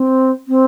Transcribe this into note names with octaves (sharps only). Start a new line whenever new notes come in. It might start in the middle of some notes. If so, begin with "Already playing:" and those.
Already playing: C4
C4